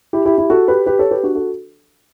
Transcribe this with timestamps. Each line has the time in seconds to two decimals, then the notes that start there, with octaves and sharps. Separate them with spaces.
0.13 E4 G4
0.25 E4 G4
0.38 E4 G4
0.50 F#4 A4
0.68 G4 B4
0.86 G4 B4
0.99 A4 C#5
1.11 G4 B4
1.23 D4 F#4
1.35 F#4 A4